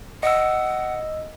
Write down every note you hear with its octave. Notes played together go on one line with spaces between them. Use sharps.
D#5 F#5 E6